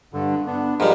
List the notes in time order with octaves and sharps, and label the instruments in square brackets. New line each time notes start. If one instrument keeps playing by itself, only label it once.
[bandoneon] G2 D3
B3 D4
[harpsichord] G#2 G3 [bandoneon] F3 A#4